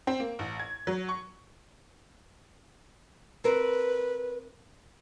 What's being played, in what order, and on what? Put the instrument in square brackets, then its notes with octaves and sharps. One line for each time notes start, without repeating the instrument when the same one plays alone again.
[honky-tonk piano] C4
A#3
A1
G#6
F#3
C#6
[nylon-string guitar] C4 A#4 [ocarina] B4